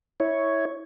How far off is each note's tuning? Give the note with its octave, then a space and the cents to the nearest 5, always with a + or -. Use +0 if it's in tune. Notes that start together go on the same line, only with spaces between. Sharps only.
E4 -15 C#5 +0